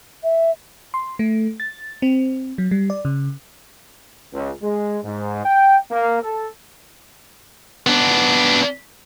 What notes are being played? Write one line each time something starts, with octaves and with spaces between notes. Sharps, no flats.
E5
C6
A3
A6
C4
F#3
G3
D5
C#3
C#2
G#3
G#2
G5
A#3
A4
B3 D4